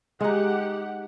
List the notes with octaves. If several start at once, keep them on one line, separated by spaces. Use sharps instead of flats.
G#3 D#4 G4 F#5